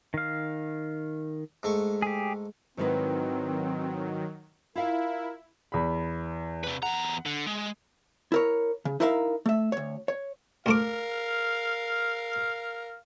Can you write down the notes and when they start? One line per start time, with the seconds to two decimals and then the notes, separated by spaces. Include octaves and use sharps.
0.14 D#3 F5
1.63 G#2 A3 C#6
2.02 G4 G#4
2.77 G#2 D#3 F#3 C4 E4 B4
4.75 E4 F4 A#4 F5
5.72 E2 B5
6.64 C3 B4
6.83 E2 F#5 A#5
7.26 D3
7.47 G#3
8.32 E4 A#4 C#5
8.85 C#3
9.00 D#4 E4 A#4 C5 E5 F5
9.46 A3 E5
9.72 D2 C#5
10.08 C#5
10.66 D2 A3 A#4 F5 D6